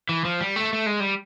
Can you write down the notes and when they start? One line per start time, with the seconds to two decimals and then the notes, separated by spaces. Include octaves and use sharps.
0.09 E3
0.25 F3
0.41 G3
0.56 A3
0.73 A3
0.86 G#3
1.00 G3